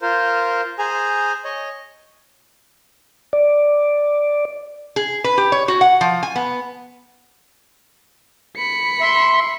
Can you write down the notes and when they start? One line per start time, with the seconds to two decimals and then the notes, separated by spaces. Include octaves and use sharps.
0.01 F4 A#4 C5
0.79 G#4 C5 G#5 A#5
1.45 C#5 D#5
3.33 D5
4.96 G#4
5.24 B4
5.38 G4
5.52 C#5
5.68 F#4
5.81 F#5
6.01 F3
6.23 G#5
6.36 B3
8.57 B5 C#7
9.01 E5 C6